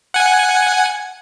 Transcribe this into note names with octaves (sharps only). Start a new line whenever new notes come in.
F#5 G#5